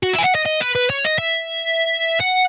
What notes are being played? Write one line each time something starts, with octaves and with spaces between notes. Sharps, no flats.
F#4
E5
G#5
F#5
D#5
D#5
B4
B4
C#5
D#5
E5
F#5